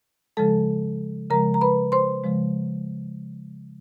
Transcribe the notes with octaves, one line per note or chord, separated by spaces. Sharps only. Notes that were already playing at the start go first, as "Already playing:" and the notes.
C#3 F3 G#3 A4 A5
C#3 F3 G#3 A#4 A#5
A#5
B4 B5
C5 C6
C#3 F3 G#3